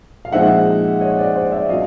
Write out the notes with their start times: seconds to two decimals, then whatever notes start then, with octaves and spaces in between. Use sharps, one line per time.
0.25 F5
0.32 A#2 F3 G#3 C4 D#4 E5 F#5
1.01 C#5 D#5
1.18 C5 D5
1.35 C5 D5
1.52 D5 E5
1.69 A#2 F#3 A#3 D4 D#5 F5